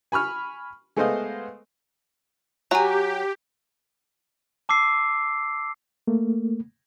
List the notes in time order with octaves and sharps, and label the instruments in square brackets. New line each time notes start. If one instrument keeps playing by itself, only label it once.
[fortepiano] G#5 B5 C#6 F6
G#3 A3 B3 C5 D#5 F5
[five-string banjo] F#3 F#4 [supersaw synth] G4 [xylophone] G#5 A#5
[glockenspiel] A5 D6 E6 C7
[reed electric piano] A3 A#3